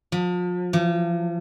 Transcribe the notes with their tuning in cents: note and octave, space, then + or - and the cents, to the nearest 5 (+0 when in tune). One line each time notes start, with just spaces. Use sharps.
F3 +35
F3 -40